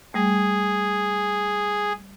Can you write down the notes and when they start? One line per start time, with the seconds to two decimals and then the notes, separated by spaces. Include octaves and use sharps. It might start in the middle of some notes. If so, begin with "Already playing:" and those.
0.14 G3 A3 G#4